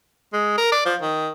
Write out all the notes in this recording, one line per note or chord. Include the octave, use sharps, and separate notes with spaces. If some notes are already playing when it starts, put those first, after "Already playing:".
G#3
A#4
D5
F3
D#3